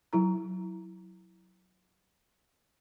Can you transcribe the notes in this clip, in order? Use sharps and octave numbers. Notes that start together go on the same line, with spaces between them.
F#3 E4 A#5